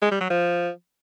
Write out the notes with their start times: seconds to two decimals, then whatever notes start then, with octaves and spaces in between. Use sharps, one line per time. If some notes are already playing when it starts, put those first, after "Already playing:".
0.02 G#3
0.11 G3
0.21 F#3
0.30 F3